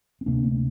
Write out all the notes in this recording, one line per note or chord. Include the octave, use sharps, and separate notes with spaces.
C4
D2 C3 A#3 D4
A3 C4